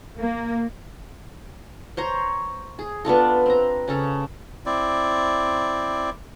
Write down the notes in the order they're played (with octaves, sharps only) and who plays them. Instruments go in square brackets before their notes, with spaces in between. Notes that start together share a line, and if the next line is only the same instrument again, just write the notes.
[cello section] A#3
[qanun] C5 C#5 A#5
G#4
B3 D4 F4 A4
C4 A#5
C#3 C#4 A4
[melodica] C4 E4 D5